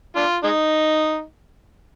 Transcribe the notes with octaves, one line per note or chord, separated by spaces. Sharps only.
D4 F4
G#3 D#4